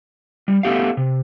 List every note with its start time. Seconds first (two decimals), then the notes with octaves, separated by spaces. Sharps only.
0.48 G3
0.63 A3 B3 G4 F5
0.97 C3